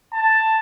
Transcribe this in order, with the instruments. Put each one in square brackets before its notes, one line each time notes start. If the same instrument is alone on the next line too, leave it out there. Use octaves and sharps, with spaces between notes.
[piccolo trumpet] A5